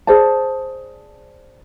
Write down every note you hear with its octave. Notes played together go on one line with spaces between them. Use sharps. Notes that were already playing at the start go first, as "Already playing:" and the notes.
G#4 C5 D5 A5